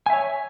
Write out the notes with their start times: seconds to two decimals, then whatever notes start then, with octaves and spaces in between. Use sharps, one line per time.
0.06 G#5
0.10 E5
0.13 C#5